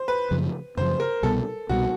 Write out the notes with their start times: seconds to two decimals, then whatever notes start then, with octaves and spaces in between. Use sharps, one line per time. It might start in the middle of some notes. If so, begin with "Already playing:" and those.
Already playing: C5
0.08 B4
0.31 F#2 C#3 F3
0.77 F#2 C#3 F3 C5
1.00 A#4
1.23 C2 B2 G3 B3 A4
1.69 C2 B2 G3 B3 F#4